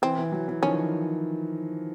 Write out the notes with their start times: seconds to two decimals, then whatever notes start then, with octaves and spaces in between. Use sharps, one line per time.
0.02 E3 C4
0.18 E3
0.32 E3 F#3
0.48 E3
0.62 D#3 F3 C#4